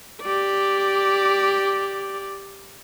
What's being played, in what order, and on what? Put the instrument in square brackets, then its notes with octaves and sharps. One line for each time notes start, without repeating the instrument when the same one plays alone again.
[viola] G4 D5